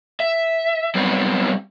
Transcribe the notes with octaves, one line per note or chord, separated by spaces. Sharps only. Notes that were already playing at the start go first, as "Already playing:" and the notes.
E5
F#3 G3 B3 C4